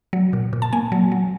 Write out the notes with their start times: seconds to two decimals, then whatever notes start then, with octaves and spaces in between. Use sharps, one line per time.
0.13 F#3
0.33 A#2
0.53 A#2
0.62 A5
0.73 A#3 G#5
0.92 F#3
1.12 F#3